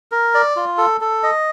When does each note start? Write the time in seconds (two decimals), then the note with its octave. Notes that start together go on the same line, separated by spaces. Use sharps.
0.12 A#4
0.34 D5
0.56 F4
0.78 A4
1.01 A4
1.23 D#5